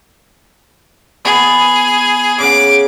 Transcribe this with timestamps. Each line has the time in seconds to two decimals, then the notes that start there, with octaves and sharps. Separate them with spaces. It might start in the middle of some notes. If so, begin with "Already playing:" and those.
1.25 B3 G#4
2.40 C#3 F#5 D6